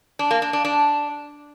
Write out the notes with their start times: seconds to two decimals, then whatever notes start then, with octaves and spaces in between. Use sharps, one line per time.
0.19 D4
0.31 A#3
0.42 D4
0.53 D4
0.65 D4